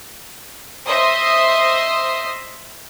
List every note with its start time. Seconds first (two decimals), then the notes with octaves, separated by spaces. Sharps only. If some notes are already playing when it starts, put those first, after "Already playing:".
0.86 C5 D#5 E5 C6 D#6